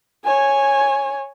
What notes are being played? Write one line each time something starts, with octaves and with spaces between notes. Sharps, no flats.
C#5 G#5